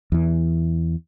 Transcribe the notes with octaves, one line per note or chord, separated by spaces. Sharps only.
E2 E3